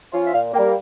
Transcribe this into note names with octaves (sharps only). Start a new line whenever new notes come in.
F3 C#4 F4
E5
A#2 F5
G3 A#3 G5